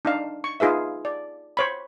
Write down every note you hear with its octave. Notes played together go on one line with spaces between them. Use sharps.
D4 D#4 F5
C#6
D#4 F4 G#4 B4 E5
D5
C5 C#5 B5